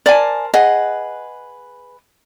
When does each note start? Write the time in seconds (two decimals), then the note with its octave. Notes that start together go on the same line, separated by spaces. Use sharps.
0.06 A#4 C5 D5 G#5 A5
0.54 G#4 B4 D#5 F#5